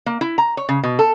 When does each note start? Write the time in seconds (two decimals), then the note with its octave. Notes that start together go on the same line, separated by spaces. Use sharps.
0.06 A#3
0.21 E4
0.38 A#5
0.57 C#5
0.69 C#3
0.83 B2
0.99 A4